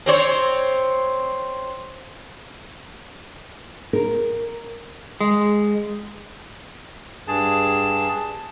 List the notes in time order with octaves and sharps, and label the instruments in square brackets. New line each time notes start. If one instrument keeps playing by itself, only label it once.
[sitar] C4 C5 C#5
[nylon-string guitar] A#4
[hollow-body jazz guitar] G#3
[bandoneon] G2 G#4 A5